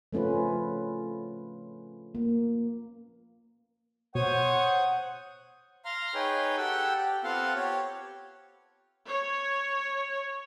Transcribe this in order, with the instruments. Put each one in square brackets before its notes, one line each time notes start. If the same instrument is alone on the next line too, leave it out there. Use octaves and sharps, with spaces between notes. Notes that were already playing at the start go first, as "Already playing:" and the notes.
[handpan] F3 A3 C#4 F4 B4
A#3
[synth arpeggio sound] B2 [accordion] C5 D#6 [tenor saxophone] C#5 [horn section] F#5
[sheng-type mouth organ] F5 A#5 C6 F6
D#4 G#4 B4 C#5 G5
G4 A4 F#5 G5 E6
G4
B3 C4 F4 A4 F5 F#5
G4 C#5
[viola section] C#5